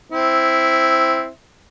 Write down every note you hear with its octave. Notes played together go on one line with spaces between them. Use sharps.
C4 E4